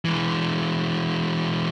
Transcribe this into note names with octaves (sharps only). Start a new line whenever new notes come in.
E3 G#3